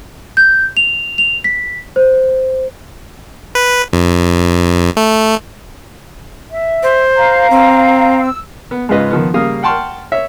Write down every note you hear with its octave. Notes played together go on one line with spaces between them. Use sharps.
G6
F7
F7
B6
C5
B4
F2
A3
E5
C5
F5 A#5
C4
E6
B3
G#2 C#3 G#3 F4 B4 D#5
D#3 F3 B3
C#3 G3 A#3 F5 D#6
F#5 G5 A5 C6 C#6 F6
C#5 E5